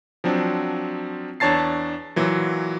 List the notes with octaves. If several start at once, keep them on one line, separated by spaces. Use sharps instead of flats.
F3 F#3 C4 D4
E2 D4 C#5 A5 A6 C7
A#2 E3 F#3